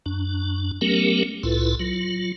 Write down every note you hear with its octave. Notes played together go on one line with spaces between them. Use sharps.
F#2 D4
F#3 A3 B3 C#4 G4 A#4
C2 A2 E4 F4 A4 B4
F#3 F4